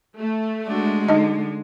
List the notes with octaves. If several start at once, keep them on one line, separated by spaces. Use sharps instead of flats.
A3
G#3 D4 F#4
D3 D#4 D#5